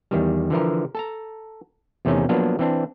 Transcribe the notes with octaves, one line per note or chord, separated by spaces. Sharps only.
E2 D#3 G3
D3 E3 F3 A#4
A4 A5 A#5
E2 C3 D#3 A3 C#4 D#4
F3 F#3 A#3 B3 D4
E3 C4 D4